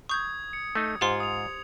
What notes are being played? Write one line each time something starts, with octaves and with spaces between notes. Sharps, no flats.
C#6 D#6 G6 G#6
C#7
A3 D#4
G#2 F4 G4 C5 F#5 C6
D#6 F7